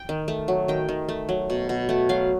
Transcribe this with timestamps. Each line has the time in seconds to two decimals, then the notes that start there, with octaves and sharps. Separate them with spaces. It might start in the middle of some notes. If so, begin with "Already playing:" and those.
Already playing: G5
0.09 D#3
0.28 A3
0.48 F#3
0.68 D#3 G5
0.89 D#3
1.09 A3
1.29 F#3
1.50 B2
1.69 B2
1.89 A3 F#5
2.09 F#3 F5